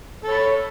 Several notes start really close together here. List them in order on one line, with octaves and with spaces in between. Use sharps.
A4 C#5 B5